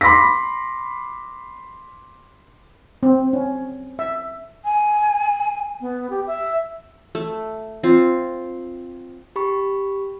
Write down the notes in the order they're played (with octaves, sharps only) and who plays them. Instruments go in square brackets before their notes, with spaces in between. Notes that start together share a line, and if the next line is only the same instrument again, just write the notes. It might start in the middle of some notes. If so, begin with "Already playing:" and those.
[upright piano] B5 C6 D6 A#6 B6
[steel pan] C4
C#4
E5
[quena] G#5
[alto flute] B3
G4
E5
[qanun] A3
C4 F4
[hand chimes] G4 B5 C#6